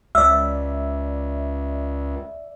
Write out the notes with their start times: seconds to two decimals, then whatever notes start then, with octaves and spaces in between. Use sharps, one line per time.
0.15 C#2 D5 E5 E6